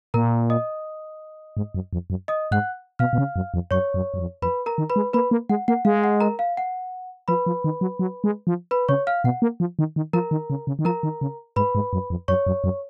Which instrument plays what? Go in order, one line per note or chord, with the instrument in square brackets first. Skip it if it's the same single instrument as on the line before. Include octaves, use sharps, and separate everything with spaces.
[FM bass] A#2 [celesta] A#4 A#5
[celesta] D#5 D#6
[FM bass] G#2
F#2
F2
F#2
[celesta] D#5 D#6
[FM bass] G#2 [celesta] F#5 F#6
[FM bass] B2 [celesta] F5 F6
[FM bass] B2
C#3
F#2
F2
[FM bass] F#2 [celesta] C#5 C#6
[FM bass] F#2
F#2
F2
[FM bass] F2 [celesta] B4 B5
[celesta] A#4 A#5
[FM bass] D#3
[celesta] B4 B5
[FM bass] G#3
[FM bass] A#3 [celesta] B4 B5
[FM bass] A#3
[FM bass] G#3 [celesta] F#5
[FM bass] A#3 [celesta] F#5
[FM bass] G#3 [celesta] F5
[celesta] F#5
A#4 A#5
F5
F#5
[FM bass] F3 [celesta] B4 B5
[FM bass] F3
D#3
F#3
F#3
G#3
F3
[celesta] B4 B5
[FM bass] C#3 [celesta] C#5 C#6
[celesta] F5 F6
[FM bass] B2 [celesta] F#5
[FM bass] A#3
F3
D#3
D#3
[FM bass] F3 [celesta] A#4 A#5
[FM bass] D#3
C#3
C#3
D#3
[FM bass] F3 [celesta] A#4 A#5
[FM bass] D#3
C#3
[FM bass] G#2 [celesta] B4 B5
[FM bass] G#2
F#2
F2
[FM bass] F#2 [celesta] C#5 C#6
[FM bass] F#2
F#2